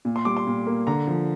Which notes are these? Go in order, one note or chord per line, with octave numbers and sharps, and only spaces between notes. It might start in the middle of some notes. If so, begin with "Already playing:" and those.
A#2
C6
G3 D6
C6
A#2
A#3
D3 A#5
F3